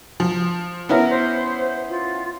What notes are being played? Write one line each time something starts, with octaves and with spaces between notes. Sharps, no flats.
F3
B3 C#4 E4 A#4
C5
F4